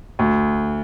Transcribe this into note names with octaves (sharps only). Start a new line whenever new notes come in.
D2